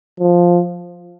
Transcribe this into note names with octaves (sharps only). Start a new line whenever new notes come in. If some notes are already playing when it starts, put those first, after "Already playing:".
F3